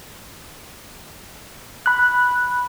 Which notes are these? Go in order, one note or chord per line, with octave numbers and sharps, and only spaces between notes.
B5 F#6